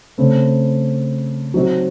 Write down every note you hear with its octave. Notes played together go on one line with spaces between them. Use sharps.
C#3 A3 C4
F#3 C4 D#4 F#4